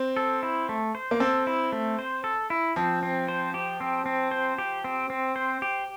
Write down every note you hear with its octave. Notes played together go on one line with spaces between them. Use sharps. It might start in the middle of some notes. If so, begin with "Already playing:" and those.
Already playing: C4
A4
E4
A3
C5
A#3
C4 A4
E4
A3
C5
A4
E4
F3 C4
C4
C5
G4
C4
C4
C5
G4
C4
C4
C5
G4